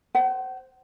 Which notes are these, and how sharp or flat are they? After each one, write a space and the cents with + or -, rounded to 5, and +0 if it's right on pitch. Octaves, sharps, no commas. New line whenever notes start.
C5 +0 F#5 +40